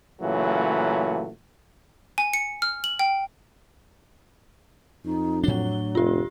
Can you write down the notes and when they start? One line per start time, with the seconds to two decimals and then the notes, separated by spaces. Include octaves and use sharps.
0.21 A#2 C#3 E3 F#3 A3
2.18 G#5
2.34 C#7
2.62 F6
2.84 F#7
2.99 G5
5.05 F2 D#4
5.44 A2 F#3 D4 G7
5.95 F1 F4 G4